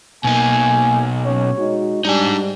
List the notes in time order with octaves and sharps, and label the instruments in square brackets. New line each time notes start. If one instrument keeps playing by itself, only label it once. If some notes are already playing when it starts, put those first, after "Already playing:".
[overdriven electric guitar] B2 D#4 [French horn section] A#3 [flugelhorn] G#5
[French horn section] F#3 C#4 [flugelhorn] C#5
[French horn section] G#3 D#4 F#4
[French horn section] G#2 G3 [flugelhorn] D4 [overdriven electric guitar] D#4 G#5